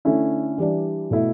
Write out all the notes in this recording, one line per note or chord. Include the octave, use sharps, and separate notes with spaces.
D3 A3 C#4 E4
E3 G3 D4
B2 A3 E4